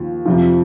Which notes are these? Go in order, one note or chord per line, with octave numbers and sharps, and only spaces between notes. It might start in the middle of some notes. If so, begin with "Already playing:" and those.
Already playing: D#2 F3
F2 C3 F3